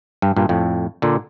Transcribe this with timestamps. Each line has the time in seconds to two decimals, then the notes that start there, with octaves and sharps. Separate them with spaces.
0.22 G2
0.36 G2 A#2
0.49 F2 A2
1.02 A#2 D3